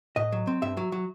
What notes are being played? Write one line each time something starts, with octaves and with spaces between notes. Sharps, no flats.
A2 D#5
F#3
C4
G2 E5
F#3
F#3